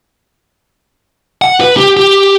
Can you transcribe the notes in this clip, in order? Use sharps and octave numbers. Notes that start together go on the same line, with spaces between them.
F#5
B4
G4
G4